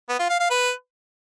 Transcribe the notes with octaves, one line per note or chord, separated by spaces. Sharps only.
B3
F4
F5
F5
B4